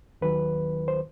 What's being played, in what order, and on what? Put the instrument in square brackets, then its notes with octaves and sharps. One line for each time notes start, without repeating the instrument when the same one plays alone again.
[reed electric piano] D#2 D#3 F#3 B4
C5